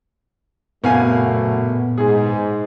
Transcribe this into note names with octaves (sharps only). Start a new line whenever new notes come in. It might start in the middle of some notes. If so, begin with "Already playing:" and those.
F#1 A#2 F#3 A3 B3 F5 G#5
G#2 G#4